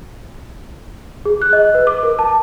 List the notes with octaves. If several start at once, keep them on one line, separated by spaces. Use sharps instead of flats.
G#4
F#6
D#5
B4
D6
A#4
A5